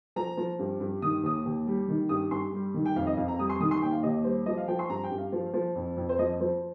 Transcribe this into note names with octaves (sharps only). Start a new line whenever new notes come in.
F3 A#5
F3
G2
G2
D#3 D#6
D#2 D#6
D#2
G3
D#3
G2 D#6
G2 C6
G3
D#3
G5
F2 F5
D#5
F2 F5
A#5
G3 D#6
C6
D#3 D#6
C6
D#2 G5
F5
D#2 D#5
G3 C5
F3 D#5
F5
F3 G5
C6
G2 A#5
G5
G2
F5
F3
F3
F2
F2
C5
F3 D#5
F3 C5